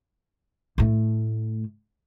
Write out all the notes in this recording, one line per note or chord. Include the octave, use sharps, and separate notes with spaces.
A2 A3